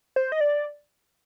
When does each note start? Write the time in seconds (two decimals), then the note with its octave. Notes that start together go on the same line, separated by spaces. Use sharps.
0.16 C5
0.32 D#5
0.41 D5